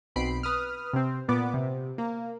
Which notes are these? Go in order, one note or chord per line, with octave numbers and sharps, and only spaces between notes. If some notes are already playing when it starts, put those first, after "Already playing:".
B1 B2 C4 B5 C7 D7
B4 D#6 F6
C3 C4
A#2 B3 D5 D6
C3
A#3